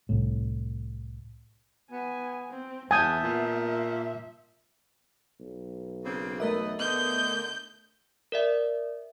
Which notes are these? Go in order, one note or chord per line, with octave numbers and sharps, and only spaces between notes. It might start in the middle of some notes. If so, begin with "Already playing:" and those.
C2 A2
B3 G#5
C4
E2 B3 E5 G#5 A5 D#6 G6
A#2
E5
B1
C#3 A#3 C4
E2 A3 A#4 B4 D#5 E5
D3 B3 D#4 D#5 G6
A#4 D5 E5